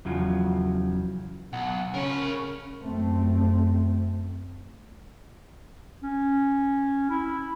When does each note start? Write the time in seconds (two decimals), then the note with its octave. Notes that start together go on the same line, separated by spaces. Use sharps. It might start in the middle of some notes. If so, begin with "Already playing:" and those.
0.05 E2 C#3 F3 F#3
1.53 B1 F#5
1.94 C#3 C#4 A#4 B5
2.82 F#2 A3 C4
6.03 C#4
7.10 E4